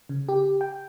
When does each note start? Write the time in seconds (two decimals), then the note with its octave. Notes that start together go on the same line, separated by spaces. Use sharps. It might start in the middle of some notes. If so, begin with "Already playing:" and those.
0.09 C#3
0.29 G4
0.61 G5